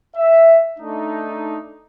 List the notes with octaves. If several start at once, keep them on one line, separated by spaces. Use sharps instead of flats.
E5
A3 D4 D#4